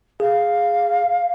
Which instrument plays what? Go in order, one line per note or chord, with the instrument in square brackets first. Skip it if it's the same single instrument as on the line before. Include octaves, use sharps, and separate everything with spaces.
[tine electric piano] G#4 [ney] F5